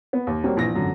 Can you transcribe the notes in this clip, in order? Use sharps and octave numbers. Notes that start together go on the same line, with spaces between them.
B3
D#2
F#3 G3 A#3 C4
A#1 E3 A#6
G#1 F#2 D3